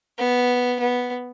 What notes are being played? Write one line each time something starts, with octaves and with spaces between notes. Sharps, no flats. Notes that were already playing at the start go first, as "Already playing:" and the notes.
B3
B3